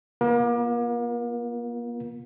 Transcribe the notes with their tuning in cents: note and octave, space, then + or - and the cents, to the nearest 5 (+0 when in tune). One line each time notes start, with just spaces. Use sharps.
A#3 +40 F4 +0 A#4 +40